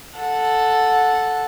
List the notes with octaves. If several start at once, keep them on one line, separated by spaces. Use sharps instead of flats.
A4 F#5